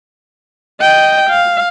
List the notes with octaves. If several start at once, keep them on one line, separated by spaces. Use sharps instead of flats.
D#5 G5
F5